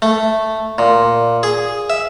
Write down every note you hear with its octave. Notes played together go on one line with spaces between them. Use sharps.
A3
A#2
G#4
E5